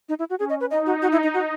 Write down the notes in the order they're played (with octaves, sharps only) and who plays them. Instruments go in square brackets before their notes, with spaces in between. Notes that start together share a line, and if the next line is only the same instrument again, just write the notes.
[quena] D#4
E4
F#4
[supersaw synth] C#4 [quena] G#4
[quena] D#5
B4
[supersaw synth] D#4 [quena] D#5
[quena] F#4
F#4
E4
D#4
F#4